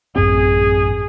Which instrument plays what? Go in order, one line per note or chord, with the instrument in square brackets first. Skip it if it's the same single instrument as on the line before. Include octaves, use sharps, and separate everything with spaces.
[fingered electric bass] A1 F#2 C4 [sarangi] G#4